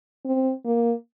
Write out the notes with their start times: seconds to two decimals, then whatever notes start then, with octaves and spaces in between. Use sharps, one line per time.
0.25 C4
0.65 A#3